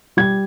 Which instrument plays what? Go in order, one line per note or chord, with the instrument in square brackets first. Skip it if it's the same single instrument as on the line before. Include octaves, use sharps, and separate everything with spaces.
[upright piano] G3 G#6